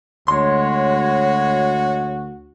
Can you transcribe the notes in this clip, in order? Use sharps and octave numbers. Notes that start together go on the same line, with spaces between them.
D2 G#3 F#4 C#5 C6